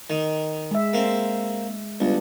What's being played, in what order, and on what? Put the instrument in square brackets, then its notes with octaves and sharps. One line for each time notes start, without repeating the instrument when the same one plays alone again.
[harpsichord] D#3
[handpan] G#3 E5
[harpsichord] A#3 C4
[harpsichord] C#2 [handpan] G3 B3 D4